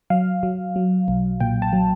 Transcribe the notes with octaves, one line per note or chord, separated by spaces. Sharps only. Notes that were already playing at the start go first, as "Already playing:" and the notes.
F#3 F5
F#3
F#3
B1
A#2 G5
A5
F#3